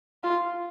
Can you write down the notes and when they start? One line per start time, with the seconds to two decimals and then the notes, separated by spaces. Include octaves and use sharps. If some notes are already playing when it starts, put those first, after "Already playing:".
0.24 F4